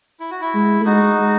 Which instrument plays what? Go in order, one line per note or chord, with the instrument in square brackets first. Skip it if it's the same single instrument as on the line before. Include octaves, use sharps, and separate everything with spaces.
[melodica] E4
F#4
E4
[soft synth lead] G#3
A3
[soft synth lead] G#3 [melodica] D#4 F#4
[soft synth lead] G#3